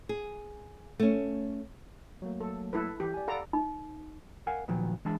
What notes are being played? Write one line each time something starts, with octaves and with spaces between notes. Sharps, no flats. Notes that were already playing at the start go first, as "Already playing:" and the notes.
G#4
A3 C#4
F#3 A3 A#3
A4
E4 A4 B4
E3 E4 G4
D5 G#5
A4 D5 F5 F#5 A#5 B5
D#4
A#4 F5 F#5 G#5
A#2 D#3 F3 F#3 B3
E3 G#3 D4 A5 B5